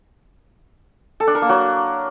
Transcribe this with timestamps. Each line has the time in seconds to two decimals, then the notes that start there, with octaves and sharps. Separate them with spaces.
1.20 A4
1.27 D4
1.35 A#4
1.42 A#3
1.49 F#3